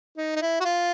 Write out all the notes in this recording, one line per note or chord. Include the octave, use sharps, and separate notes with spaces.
D#4
D#4
E4
F#4
F4